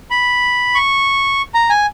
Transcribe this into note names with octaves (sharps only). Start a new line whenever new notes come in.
B5
C#6
A#5
G#5